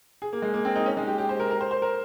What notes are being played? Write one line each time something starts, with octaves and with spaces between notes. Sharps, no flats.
G#4
A#3
G#3
A#3
C4
D#4
C#4
G#3
G4
G4
C5
A#4
A#4
C5
C5
A#4